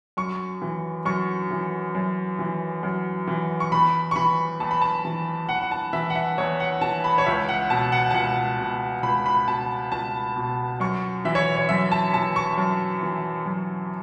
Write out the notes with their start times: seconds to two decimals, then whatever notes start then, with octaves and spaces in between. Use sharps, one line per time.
0.17 F#2 C#6
0.62 E3
1.05 F#2 C#6
1.51 E3
1.95 F#2
2.39 E3
2.83 F#2
3.28 E3
3.60 C#6
3.72 E2 B5
4.11 C#6
4.16 E3 B5
4.60 E2 A5
4.71 B5
4.81 A5
5.05 E3
5.49 E2 F#5
5.61 F#5
5.71 A5
5.93 E3 E5
6.10 F#5
6.15 E5
6.38 E2 C#5
6.60 F#5
6.81 E3 A5
7.04 B5
7.18 C#5
7.26 C#2 E5
7.49 F#5
7.70 B2 A5
7.92 F#5
8.10 A5
8.14 C#2 F#5
8.59 B2
9.03 C#2 B5
9.26 B5
9.48 B2 A5
9.92 C#2 A5
10.36 B2
10.80 F#2 C#6
11.25 E3 E5
11.35 C#5
11.56 C#5
11.69 F#2 E5
11.92 A5
12.14 E3 A5
12.36 C#6
12.58 F#2
13.03 E3
13.46 F#2